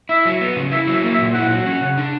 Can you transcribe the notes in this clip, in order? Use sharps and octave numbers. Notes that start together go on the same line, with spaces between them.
E4 E5
F#3
B3
C#3
E4 E5
F#3
E5
A#3
E5
A#2
E4 F#5
F#3
C#4
C#3
D4